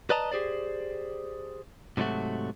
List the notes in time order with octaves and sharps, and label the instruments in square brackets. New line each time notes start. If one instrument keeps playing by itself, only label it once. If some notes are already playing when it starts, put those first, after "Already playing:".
[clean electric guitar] B4 D5 D#5 A5 A#5
G4 G#4 C5 D5
G#2 C3 F#3 G3 A3 F#4